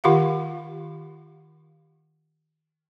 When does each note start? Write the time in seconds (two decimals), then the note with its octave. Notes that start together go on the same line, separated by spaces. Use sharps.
0.04 D#3 F4 G4 F5 F#5